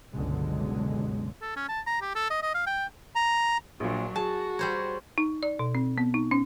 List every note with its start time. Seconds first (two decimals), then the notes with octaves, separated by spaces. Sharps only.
0.15 G1 C#2 B2 D3 F#3 G#3
1.42 A4
1.56 C#4
1.69 A5
1.87 A#5
2.02 G4
2.15 A4
2.30 D#5
2.42 D#5
2.54 F5
2.67 G5
3.15 A#5
3.80 A#1 A#2 F#3 D4
4.16 F#4 G#4 A5
4.59 G3 C5 C#5
5.18 D#4
5.43 D5
5.59 B2
5.75 C4
5.98 B3
6.14 D#4
6.31 C#4